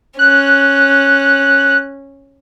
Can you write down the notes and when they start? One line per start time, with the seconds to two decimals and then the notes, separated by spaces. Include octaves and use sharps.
0.19 C#4 F#6